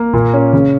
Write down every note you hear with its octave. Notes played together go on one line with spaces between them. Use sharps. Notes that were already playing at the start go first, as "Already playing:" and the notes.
Already playing: A#3
A#2
C#4
C#3